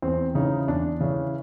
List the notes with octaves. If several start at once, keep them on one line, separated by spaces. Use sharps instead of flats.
E2 C4
C#3 E3 D#4
E2 D4
C#3 E3 C#4